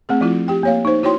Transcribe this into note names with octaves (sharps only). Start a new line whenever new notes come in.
A3 C4 G#4
F3 A3 E4 F4
G4 G5
A#3 C#5 F5
D#4 C5
E4 F#4 C#5 G5 C6